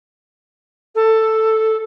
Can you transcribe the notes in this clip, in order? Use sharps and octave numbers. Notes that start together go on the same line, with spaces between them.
A4